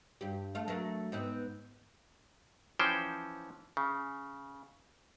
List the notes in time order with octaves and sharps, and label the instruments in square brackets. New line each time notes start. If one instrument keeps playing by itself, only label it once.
[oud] G2 G4
A3 F5
F#3 A3 A#4
G#2 B3 C4
[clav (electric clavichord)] E3 F3 C#4 C5 G5
C#3